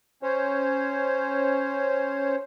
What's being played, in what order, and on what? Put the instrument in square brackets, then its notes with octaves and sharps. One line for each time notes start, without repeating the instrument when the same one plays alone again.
[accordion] C#4 C5 C#5